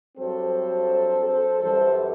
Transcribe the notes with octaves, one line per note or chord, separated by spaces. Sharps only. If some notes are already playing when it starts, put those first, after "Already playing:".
G2 F#3 C4 A4 C5
A4 C5
F#2 E3 G3 A4 C5